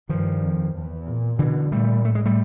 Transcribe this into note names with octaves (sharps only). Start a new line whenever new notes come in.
G2 D#3 F3
F2
E2
A#2
B2 D3 E3
A#2 G3 A3
A2 A3
G#3
G3 A3